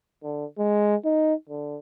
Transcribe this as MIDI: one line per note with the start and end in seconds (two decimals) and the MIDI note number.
0.23 0.45 50
0.58 0.96 56
1.05 1.34 63
1.49 1.79 50